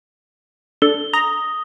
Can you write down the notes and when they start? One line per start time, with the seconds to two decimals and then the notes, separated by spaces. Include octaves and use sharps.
0.82 D4 A4 G7
1.13 A#5 D#6